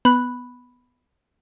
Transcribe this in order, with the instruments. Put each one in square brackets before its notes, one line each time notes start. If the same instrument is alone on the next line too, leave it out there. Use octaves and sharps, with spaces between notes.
[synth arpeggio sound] B3 [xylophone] B5 F#6